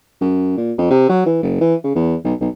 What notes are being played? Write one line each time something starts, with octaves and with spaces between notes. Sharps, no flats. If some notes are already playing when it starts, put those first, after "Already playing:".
F#2
A#2
F2
C3
F#3
E3
F#1
E3
C#3
E2
B1
B1